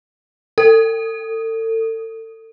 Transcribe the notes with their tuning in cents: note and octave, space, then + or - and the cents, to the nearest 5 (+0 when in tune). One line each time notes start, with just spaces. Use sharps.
A4 +35